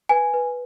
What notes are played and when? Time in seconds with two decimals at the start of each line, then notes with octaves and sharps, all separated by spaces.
0.09 B4 G#5
0.34 B4